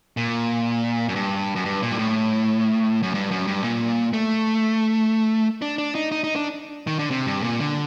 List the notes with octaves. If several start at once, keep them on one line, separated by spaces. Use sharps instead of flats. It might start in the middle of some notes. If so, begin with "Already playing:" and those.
A#2
F#2
G2
F#2
G2
A#2
G2
A2
F#2
G2
F#2
G2
A#2
A3
D4
D4
D#4
D#4
D#4
D4
D#3
D3
C3
G2
A#2
D3